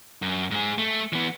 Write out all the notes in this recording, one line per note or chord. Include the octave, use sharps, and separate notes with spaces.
F#2
G#2 G#4
A3
E3 B3